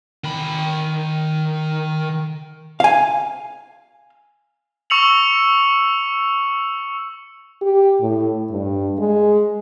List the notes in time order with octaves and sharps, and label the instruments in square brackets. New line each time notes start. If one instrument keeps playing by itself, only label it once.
[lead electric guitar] D#3 B5
[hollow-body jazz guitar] F5 G#5
[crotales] C#6 E6 C#7 F7 F#7
[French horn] G4
A2
G2
G#3